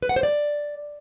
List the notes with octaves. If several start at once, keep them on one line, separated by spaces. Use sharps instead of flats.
B4
F#5
C5
D5